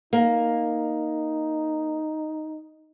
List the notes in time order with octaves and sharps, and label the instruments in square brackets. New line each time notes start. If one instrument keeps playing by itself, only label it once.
[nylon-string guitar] A#3 [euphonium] D#4